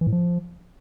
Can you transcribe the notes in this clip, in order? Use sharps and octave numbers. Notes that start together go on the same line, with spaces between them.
E3
A2
F3